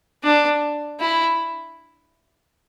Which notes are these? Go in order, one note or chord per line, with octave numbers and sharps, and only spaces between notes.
D4
E4